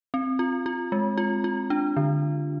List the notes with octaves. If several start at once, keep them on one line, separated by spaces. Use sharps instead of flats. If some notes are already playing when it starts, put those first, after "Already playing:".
C4
F4
F4
G#3
F4
F4
D4
D3